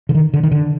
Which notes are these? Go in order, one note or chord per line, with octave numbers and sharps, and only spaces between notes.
D3
D#3
D3
D#3
D3